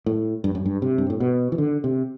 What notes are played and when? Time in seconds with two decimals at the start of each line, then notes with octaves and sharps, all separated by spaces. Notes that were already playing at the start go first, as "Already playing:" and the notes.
0.06 A2
0.44 G2
0.55 F#2
0.66 G2
0.82 C3
0.98 G2
1.10 A2
1.20 B2
1.52 E3
1.58 D3
1.84 C3